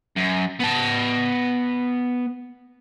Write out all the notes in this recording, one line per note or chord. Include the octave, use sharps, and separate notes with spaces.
F#2
B3 A5